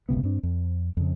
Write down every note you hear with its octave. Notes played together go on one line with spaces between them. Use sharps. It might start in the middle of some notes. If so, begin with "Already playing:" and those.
F#1 C#2 C3 B3
G2 C4 D4
F2
F2 C#3